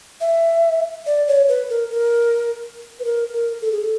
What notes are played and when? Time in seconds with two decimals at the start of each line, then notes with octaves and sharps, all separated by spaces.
0.21 E5
1.06 D5
1.28 C#5
1.48 B4
1.70 A#4
1.91 A#4
3.00 B4
3.05 A#4
3.33 A#4
3.61 A4
3.72 G#4
3.81 A4